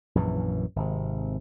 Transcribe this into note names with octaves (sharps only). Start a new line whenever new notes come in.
A#1 F#2 E3
G#1 C3